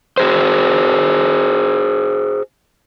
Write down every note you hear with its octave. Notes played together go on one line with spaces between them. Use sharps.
F#4 G#4 C5